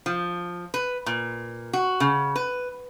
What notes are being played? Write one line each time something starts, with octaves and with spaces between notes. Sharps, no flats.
F3
B4
A#2
F#4
C#3
B4